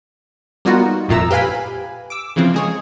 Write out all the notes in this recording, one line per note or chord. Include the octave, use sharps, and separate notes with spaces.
G3 A#3 B3 D#4 F4 F#4
G1 F2 A#2 A3 A#5 E6
G4 B4 F5 G#5 B5
D6 E6
C#3 E3 F3 C4
G#3 G#4 C#5